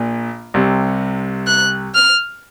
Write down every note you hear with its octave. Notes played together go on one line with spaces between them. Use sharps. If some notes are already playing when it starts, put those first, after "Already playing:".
Already playing: A#1 A#2
C2 C3
F#6
F6